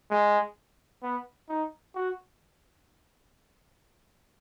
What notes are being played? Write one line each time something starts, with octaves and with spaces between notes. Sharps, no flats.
G#3
B3
D#4
F#4